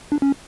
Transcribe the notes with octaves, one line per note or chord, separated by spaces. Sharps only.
D4
C#4